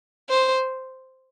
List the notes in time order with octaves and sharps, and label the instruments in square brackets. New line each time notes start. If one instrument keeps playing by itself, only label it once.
[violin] C5